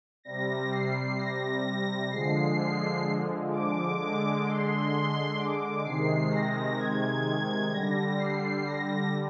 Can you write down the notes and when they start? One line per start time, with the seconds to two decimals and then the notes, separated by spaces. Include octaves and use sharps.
0.24 C3 G3 A#6
0.71 C7
1.18 A#6
2.11 D3 F3 G#3 C7
3.51 D6
3.98 D3 G#3
4.44 C6
5.38 D6
5.84 C3 D#3 G#3 C7
6.31 A#6
6.78 G#6
7.71 D3 G3 A#6
8.18 C7
8.65 A#6